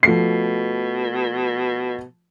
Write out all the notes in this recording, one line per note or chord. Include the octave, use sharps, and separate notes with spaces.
B2 F3 A3 C7